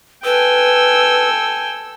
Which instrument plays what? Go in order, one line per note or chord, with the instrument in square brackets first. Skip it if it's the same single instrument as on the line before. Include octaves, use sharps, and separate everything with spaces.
[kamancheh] A4 E6 [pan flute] B4 [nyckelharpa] G5 G#5